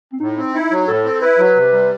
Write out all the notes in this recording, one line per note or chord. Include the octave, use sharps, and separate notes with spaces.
C4
A2 D#4
C4
D#4 E4
F#3
A2 A4
C4
E4 B4
F#3
C3
G3